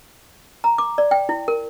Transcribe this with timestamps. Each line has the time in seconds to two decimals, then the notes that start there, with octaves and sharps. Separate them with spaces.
0.64 A#5
0.78 D6
0.98 D5
1.11 G5
1.29 E4
1.48 A#4